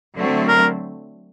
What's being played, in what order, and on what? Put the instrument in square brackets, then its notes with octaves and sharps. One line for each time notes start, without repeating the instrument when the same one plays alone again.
[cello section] D3 F#3 A3 C4
[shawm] A#4